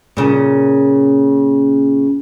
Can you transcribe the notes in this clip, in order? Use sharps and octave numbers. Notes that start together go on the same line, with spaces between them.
A#2 C#3